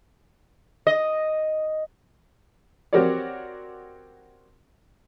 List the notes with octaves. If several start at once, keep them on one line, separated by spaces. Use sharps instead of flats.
D#5
C4 F#4 G4 A#4 C#5 D5